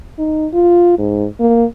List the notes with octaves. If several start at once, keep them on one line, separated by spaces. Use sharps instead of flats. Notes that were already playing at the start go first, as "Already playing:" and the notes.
D#4
F4
G#2
A#3